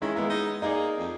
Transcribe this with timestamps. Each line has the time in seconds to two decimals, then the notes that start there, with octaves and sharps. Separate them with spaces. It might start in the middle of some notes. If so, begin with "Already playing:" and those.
0.02 D#3 G#3 C#4 E4
0.16 G#3 A#3 B3 E4
0.30 D#4
0.62 A#3 D#4 G#4 D5
0.98 F2